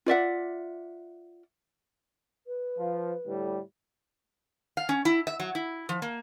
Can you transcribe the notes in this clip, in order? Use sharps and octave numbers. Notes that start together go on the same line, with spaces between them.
F4 D5 E5 F#5
B4
F3
A2 D3 G3
F5
C#4
E4
E5
F#3
E4
F3
A#3